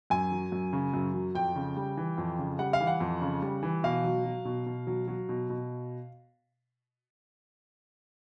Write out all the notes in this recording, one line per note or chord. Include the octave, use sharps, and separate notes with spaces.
F#2 G#5
F#3
F#2
C#3
F#2
F#3
F2 G5
C#3
G3
E3
F2
C#3
G3 F#5
F5
E3
F#5
F2
C#3
G3
E3
B2 F5
F#3
F#3
B2
B2
F#3
F#3
B2
B2